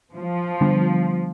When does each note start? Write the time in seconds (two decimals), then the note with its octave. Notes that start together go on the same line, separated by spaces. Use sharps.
0.14 F3
0.61 D3 G3 B3 D4